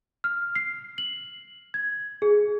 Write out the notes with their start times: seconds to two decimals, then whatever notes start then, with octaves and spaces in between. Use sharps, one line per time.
0.24 F6
0.55 C7
0.98 F#7
1.74 G#6
2.22 G#4